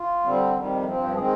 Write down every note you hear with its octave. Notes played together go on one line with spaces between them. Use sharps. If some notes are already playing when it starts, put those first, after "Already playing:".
Already playing: F4
D3 G3 C4
F2 C3 D#3 G3
G2 F3 C4
D#3 G#3 C4 G#4